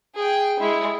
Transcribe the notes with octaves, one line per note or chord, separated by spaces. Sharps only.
G#4 G5
G#3 E4